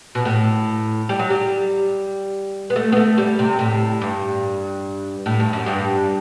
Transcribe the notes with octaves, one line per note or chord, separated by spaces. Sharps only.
B2
A2
G3
F#3
G3
B3
A3
B3
A3
G3
C3
A2
G2
A2
G2
F#2
G2